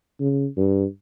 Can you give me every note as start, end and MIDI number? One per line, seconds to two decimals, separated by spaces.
0.20 0.47 49
0.57 0.85 43